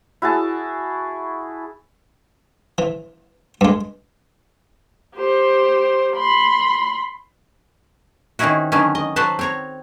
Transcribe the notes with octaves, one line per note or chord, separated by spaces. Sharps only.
E4 F#4 G#4 A5
E3
G2 G#3
G4 C5
B5 C6
D#3 C4 C#4 D#4 E4 F#4
D3 D#3 F#3 B3 C#4
D#5
F#3 F#4 A4 B4 C5 A5
C4 C#5 A#5